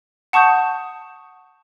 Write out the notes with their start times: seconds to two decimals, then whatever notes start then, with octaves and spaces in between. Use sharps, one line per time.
0.33 F#5 A5 C#6 D#6 G6